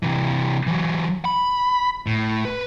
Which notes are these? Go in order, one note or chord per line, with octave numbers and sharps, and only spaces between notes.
C3 E3
E3 F#3
B5
A2
B4